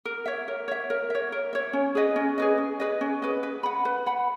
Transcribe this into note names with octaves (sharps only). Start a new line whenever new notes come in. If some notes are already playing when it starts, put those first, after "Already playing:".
A#4
C#5 E5
A#4
C#5 E5
A#4
C#5 E5
A#4
C#5 E5
C#4
G#4 B4 D#5
C#4
G#4 B4 D#5
C#4
G#4 B4 D#5
C#4
G#4 B4 D#5
B4
F#5 B5
B4
F#5 B5